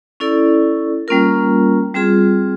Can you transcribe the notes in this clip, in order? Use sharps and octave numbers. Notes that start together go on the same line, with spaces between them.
C#4 E4 A4 D5
G3 A#3 C#4 F4 A#4
G3 C4 F4 G#4